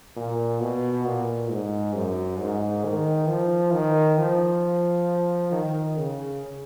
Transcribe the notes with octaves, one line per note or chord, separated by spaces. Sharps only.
A#2
B2
A#2
G#2
F#2
G#2
D#3
F3
D#3
F3
D#3
C#3